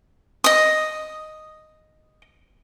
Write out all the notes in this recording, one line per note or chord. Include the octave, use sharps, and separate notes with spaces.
D#5 D#6